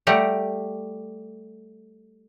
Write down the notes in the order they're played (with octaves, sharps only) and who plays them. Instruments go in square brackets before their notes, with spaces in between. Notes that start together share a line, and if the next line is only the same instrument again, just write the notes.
[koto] G3 A3 G4 F#5 A#5